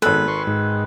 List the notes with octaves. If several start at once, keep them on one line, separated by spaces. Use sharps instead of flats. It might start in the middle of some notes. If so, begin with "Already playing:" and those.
G#1 G#3 B3 A4 B4
C6 C#6
G#2 G#3 D#4